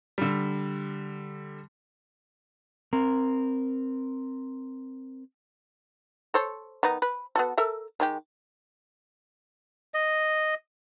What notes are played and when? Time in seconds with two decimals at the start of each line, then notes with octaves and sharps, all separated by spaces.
0.18 D3 G3
2.93 C4 A#4
6.34 A4 C5 C#5
6.83 D#3 B3 D#4
7.02 B4
7.36 B3 F#4 A4
7.58 A4 A#4 E5
8.00 D#3 G#3 G4
9.94 D#5